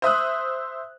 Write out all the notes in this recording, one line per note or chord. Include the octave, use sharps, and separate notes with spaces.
C5 E5 D#6 F#6